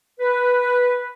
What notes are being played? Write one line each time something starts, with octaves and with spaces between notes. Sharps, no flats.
B4